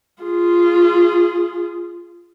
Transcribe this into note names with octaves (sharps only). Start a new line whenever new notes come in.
F4 G#4